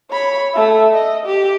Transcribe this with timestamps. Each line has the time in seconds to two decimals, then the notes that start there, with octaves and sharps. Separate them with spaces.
0.11 C#5 B5
0.54 A3 E5
0.93 D#5
1.26 G4